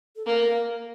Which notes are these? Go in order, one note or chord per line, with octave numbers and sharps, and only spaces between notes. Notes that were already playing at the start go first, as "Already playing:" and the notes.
A4
A#3 A#4